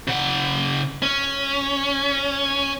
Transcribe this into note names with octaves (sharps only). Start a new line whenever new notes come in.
C#3 F#5
C#4